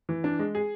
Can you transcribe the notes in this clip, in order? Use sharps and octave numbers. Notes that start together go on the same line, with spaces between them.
E3
D4
G#3
G#4